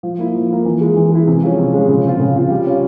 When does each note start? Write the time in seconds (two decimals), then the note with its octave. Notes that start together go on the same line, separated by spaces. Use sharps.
0.03 F3
0.18 A#3 E4
0.35 F3
0.50 A#3 E4
0.65 E3
0.81 G#3 E4
0.96 E3
1.12 G#3 E4
1.27 C3
1.43 F3 G#3 C#4
1.59 C3
1.74 F3 G#3 C#4
1.88 C#3
2.05 F3 C4 F4
2.19 C#3
2.36 F3 C4 F4
2.50 G3
2.67 C#4 F4